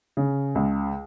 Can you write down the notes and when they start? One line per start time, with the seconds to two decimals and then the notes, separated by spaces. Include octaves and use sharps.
0.17 C#3
0.55 C#2